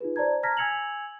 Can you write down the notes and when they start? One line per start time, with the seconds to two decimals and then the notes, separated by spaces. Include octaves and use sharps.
0.01 D#4 F4 G#4 B4
0.16 C5 D5 A5 A#5 G#6
0.43 A5 A#5 F6 G#6 A#6 B6
0.57 G#5 E6 G#6 C#7 F7 F#7